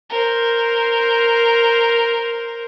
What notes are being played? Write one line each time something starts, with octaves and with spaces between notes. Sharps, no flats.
A#4 C5